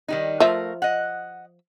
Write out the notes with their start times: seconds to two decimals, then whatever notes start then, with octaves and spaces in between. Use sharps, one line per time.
0.08 D#3 G3 D#4
0.40 F3 A3 A#4 E5 F5
0.82 D#5 F#5